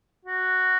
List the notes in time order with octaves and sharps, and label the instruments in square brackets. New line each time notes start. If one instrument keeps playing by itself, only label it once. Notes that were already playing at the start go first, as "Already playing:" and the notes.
[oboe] F#4